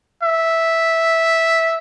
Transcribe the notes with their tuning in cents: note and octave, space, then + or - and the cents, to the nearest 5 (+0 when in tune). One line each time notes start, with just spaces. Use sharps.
E5 -5